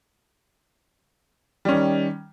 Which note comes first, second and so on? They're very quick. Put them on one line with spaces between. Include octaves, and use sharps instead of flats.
G3 C#4 D#3